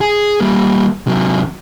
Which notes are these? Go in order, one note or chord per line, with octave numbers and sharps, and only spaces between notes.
G#4
G3 A#3
C3 F#3